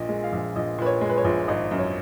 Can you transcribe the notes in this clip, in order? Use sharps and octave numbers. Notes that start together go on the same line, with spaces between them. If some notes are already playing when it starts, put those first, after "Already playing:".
Already playing: A#1 A#2 D#5
G#3
F5
A#1
A#1 D#5
A#2 B4
C#5
G#3
B4
C#5
A#1
G#1 D#5
F#2
C#5